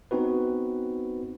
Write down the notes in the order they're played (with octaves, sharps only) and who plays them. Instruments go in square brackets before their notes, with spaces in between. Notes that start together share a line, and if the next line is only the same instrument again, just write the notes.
[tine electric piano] B3 C4 D#4 F#4 B4